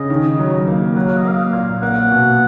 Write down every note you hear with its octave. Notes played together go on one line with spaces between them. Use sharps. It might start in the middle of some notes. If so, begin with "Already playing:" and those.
Already playing: C#3 D#5
D#3
F#3
A#3
F#3 F#5
F5
D#5
A#3 F5
A#2
A#3 F#5
B2